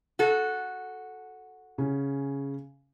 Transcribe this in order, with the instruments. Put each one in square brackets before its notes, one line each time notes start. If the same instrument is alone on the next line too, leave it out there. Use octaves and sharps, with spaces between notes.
[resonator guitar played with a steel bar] F#4 A4
[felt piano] C#3 C#4